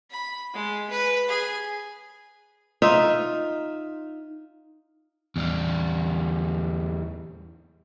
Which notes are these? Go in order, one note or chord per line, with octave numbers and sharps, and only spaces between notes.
B5
G#3
B4
G#4
D#4 F4 E5
E2 G3